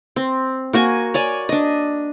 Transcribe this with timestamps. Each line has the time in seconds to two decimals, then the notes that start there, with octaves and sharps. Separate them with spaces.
0.16 C4
0.73 A#3 F#4 G#5 C#6
1.14 C#5 D5 G#5
1.49 D4 D#5